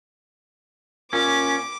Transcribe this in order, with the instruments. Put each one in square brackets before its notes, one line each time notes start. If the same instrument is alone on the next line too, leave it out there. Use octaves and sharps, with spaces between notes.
[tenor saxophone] A#2 [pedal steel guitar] C#4 [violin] D6